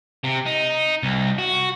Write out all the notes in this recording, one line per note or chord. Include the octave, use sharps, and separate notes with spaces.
C3
D#4
C2
F#4